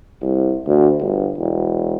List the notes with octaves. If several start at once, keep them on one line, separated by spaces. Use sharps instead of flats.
C2
D2
G1
E1